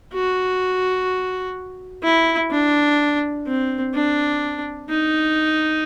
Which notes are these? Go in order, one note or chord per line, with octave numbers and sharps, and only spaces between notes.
F#4
E4
D4
C4
D4
D#4